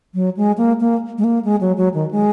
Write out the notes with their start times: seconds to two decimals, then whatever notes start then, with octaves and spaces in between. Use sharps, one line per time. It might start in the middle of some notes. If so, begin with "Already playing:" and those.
0.14 F#3
0.37 G#3
0.58 A#3
0.81 A#3
1.18 G#3
1.24 A#3
1.45 G#3
1.61 F#3
1.77 F#3
1.94 D#3
2.11 G#3